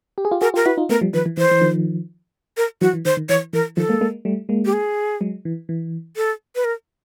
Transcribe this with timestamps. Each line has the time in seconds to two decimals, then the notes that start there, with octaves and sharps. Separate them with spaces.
0.18 G4
0.25 G#4
0.31 F4 G4
0.41 F#4 G#4 A#4
0.54 F4 G4 A#4
0.66 E4 F#4 B4
0.77 D#4 F4
0.89 A3 B3 A#4
1.01 F3 G3
1.13 D#3 F3 B4
1.26 E3
1.37 E3 C5
1.51 E3
1.61 D#3 F3
2.57 A#4
2.81 E3 F#3 F#4
2.93 E3
3.05 D#3 C5
3.17 D#3
3.29 E3 C#5
3.53 E3 A#4
3.77 D#3 F3 A4
3.89 G#3 A#3
4.01 G#3 A#3
4.25 G3 A3
4.49 G#3 A#3
4.65 G4
4.73 G#4
5.21 F#3 G#3
5.45 E3
5.69 E3
6.17 A4
6.55 B4
6.65 A#4